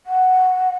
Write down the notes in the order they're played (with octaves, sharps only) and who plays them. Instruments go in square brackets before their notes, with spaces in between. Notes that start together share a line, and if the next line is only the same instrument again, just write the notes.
[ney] F#5